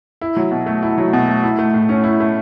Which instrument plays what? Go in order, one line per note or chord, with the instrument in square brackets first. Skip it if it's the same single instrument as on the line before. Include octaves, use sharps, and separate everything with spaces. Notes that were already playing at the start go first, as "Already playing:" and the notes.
[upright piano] E4
F#3
B2
A3
E4
F#3
B2
A3
E4
A3
A2
C#4
E4
A3